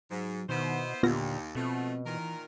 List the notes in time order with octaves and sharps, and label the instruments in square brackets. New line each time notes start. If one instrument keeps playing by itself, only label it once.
[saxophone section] G#2 [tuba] F#3
[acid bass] B2 [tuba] D#3 [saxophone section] B3 E4 C5
[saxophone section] D#2 [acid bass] A#2 [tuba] D3 [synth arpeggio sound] B3 F4 A#6
[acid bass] B2 [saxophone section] F3 A3 [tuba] C4
[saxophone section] A#2 D#3 A#4 [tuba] E3